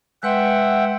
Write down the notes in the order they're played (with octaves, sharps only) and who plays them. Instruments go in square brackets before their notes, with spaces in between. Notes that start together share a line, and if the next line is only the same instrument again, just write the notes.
[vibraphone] G#3 B4 C6 [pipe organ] E5 F#5 G5